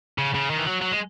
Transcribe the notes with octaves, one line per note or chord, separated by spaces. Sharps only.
C#3
C#3
D#3
E3
F#3
F#3
G#3